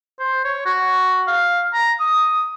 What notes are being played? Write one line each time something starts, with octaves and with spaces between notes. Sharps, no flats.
C5
C#5
F#4
F5
A#5
D#6